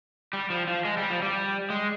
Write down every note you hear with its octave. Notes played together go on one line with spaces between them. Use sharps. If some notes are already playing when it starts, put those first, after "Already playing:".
G3
F3
F3
G#3
G3
F3
G3
G#3